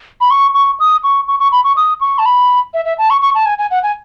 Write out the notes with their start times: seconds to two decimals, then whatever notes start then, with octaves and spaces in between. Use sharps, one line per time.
0.21 B5
0.31 C#6
0.54 C#6
0.80 D#6
1.04 C#6
1.28 C#6
1.40 C#6
1.52 B5
1.64 C#6
1.77 D#6
2.01 C#6
2.18 A5
2.26 B5
2.74 E5
2.85 E5
2.98 A5
3.10 C#6
3.22 C#6
3.35 A5
3.46 G#5
3.58 G#5
3.71 F#5
3.83 G#5